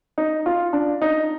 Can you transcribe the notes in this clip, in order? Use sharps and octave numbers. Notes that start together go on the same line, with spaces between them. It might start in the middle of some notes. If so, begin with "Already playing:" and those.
D#4
F4
D4
D#4